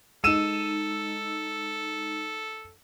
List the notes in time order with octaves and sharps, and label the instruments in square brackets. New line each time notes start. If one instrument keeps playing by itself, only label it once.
[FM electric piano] G#3 D#4 [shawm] A4 [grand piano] E6 D#7 E7